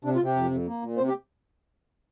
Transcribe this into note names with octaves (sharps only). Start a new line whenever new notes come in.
C3 D4
F4
C3 G4
F2
F2
A#3
A#2
C3 C5
G4